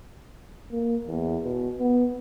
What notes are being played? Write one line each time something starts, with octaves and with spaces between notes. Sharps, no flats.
A#3
E2
B2
B3